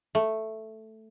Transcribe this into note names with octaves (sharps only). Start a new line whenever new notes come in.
A3